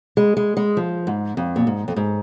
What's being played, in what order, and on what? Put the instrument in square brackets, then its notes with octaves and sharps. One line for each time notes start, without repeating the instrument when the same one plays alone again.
[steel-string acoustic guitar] G#3
G#3
G#3
F3
G#2
F2
A#2
G#2
F2
G#2